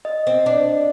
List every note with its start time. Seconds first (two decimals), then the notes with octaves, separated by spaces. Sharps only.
0.05 D#5
0.27 C4
0.46 D4